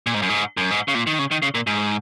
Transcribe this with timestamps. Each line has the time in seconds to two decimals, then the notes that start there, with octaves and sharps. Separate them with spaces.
0.07 A#2
0.14 G#2
0.22 F#2
0.29 G#2
0.57 F#2
0.71 G#2
0.88 C#3
0.95 A#2
1.07 D#3
1.19 C#3
1.31 D#3
1.43 C#3
1.55 A#2
1.67 G#2